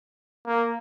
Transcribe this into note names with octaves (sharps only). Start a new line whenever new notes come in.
A#3